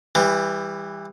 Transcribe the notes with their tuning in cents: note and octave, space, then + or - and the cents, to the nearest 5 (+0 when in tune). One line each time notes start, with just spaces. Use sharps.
E3 +0 G3 +25